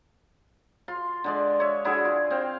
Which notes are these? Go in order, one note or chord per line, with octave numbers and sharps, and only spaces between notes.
F4 C6
D3 G#3 D5
C#5 E5
D3 E4 F#4 G#4
F4
C4 F5 G5